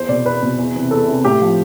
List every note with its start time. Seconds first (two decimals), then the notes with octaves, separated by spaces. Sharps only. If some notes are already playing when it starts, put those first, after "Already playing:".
Already playing: E2 C5
0.09 B2 D5
0.25 E2 B4
0.42 B2
0.58 E2
0.75 C3 E3
0.91 E2 A4
1.08 C3 E3
1.24 A2 G4
1.41 F3